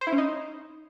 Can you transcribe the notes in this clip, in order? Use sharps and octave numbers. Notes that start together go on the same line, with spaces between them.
C5
E4
C#4
D#4